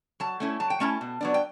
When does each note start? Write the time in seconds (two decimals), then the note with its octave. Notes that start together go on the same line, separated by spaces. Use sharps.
0.20 F#3 A5
0.40 A3 C#4 E4
0.60 F#3 A5
0.70 G5
0.80 A3 C#4 E4 A5
1.01 B2
1.21 F#3 B3 D4
1.34 G5